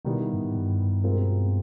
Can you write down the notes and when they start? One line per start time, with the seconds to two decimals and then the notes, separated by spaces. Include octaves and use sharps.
0.05 B2 D#3 G3 B3 E4
0.33 G2
0.38 G#2
0.55 G2
1.04 B2 G#3 C4 F4 A#4